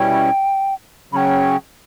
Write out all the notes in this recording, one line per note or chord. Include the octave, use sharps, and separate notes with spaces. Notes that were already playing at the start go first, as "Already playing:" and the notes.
Already playing: B2 G3 C#4 E4 G5
C#3 F#3 C#4 G5 B5